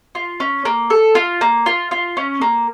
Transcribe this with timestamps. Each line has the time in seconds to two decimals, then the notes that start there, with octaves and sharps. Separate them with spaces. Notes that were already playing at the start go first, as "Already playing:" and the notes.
0.15 F4
0.40 C#4
0.65 A#3
0.90 A4
1.15 F4
1.41 A#3
1.66 F4
1.91 F4
2.17 C#4
2.41 A#3